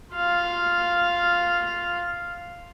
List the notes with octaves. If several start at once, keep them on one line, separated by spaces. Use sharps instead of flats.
F4 F5